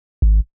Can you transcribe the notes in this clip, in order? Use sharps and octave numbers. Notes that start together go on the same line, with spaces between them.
G#1